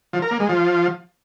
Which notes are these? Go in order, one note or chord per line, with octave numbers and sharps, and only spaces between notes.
F3
A#4
A#3
G#3
F3